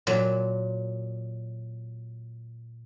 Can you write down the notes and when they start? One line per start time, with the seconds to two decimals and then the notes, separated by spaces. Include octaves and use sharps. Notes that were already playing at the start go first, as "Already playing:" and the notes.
0.07 A#2 F#3